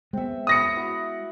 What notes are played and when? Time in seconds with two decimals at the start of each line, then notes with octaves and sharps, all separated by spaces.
0.13 G#3 B3 C4 E5
0.47 B4 C#5 D#6 A#6 C#7
0.76 E4 F#4 D6